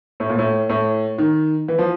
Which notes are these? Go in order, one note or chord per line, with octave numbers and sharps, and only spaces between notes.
A2
A#2
A2
A2
D#3
E3
F3